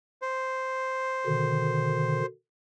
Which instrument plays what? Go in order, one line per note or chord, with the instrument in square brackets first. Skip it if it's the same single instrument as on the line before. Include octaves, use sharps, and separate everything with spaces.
[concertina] C5
[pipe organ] B2 D3 D#3